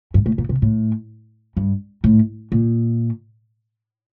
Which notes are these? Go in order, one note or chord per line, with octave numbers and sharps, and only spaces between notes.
G2
A2
A#2
C3
A2
G2
A2
A#2